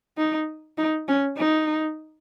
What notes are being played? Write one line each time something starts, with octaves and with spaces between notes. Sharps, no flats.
D#4
D#4
C#4
D#4